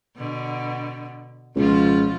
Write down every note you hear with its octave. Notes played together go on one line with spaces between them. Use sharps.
B2 D3
C#2 B2 F3 F4